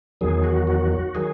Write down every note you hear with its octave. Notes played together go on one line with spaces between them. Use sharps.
E2 D#3 F#3 G#4
F#4
F#4
F#4
D#3 F#3 G#4